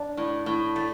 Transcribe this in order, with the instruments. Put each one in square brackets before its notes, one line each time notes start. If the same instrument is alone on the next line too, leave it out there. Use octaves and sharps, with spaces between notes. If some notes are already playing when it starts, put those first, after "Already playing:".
Already playing: [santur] D4
[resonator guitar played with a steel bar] A2
A2
A3